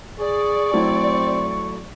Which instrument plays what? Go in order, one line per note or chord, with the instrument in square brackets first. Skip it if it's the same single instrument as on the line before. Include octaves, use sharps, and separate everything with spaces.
[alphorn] G#4 [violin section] D5 [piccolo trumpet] C#6
[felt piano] F#3 A3 E4 [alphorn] C4